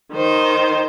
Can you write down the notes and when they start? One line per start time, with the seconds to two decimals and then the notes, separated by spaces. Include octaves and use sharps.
0.13 D#3 C5